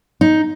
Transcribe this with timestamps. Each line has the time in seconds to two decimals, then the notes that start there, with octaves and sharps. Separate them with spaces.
0.21 D#4